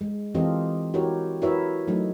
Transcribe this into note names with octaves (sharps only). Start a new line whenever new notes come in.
G#3
E3 C4 F4 G4 A4 D#5
E4 F#4 G4 A#4 C#5
E4 F#4 A#4 B4 C#5 E5
F#3 A3 D#4